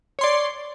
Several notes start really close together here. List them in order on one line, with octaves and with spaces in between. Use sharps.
C#5 C6 D5